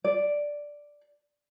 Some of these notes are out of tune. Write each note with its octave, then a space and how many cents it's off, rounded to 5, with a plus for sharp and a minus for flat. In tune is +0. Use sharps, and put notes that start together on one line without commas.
D5 +0